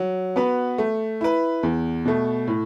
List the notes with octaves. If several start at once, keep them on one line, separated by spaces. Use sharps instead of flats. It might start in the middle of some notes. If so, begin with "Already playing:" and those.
Already playing: F#3
B3 F#4 B4
A3
E4 B4
E2
B2 A3
A2